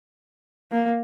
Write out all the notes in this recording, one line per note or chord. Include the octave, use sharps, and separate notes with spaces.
A#3